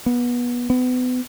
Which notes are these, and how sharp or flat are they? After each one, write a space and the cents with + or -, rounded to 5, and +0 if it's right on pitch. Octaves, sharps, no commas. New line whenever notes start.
B3 -25
B3 +30